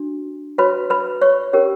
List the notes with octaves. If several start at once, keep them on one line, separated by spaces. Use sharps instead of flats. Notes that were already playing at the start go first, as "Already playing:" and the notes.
Already playing: D4 F#4
F#4 B4 C#5 B5
B4 B5
C#5 C#6
C#4 G4 A#4 C#5